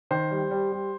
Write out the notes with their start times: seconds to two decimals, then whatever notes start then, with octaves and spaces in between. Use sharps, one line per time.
0.11 D#3 C5
0.31 G3
0.51 G3
0.72 G3